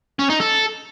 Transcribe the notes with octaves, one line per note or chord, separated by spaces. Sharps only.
C#4
D#4
A4